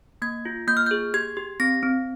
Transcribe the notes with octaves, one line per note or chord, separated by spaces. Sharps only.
A#3 G#6
F4
A#3 G6
F6
G#4 G6
G4 G#6
G4
C4 A#6
C4